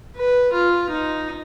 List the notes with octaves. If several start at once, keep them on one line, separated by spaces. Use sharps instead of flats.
B4
F4
D#4